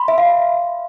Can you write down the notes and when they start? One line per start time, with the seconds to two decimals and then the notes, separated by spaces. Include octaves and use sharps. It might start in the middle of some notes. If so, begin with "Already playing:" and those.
Already playing: B5 C6
0.08 E5
0.18 F5